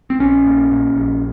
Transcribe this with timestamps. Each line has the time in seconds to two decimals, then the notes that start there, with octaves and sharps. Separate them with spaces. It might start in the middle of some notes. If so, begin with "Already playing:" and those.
0.10 C4
0.19 A#1 C#4
0.46 A#2
0.72 A#2
0.96 A#1